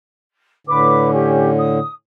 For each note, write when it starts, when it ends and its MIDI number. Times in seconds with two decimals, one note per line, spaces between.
0.67 1.79 45
0.67 1.79 50
0.67 1.11 71
0.67 1.11 86
1.12 1.50 61
1.12 1.50 67
1.57 1.90 87